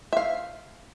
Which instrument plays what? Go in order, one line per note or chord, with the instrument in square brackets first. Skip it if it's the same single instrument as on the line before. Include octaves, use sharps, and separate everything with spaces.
[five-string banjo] E5 F5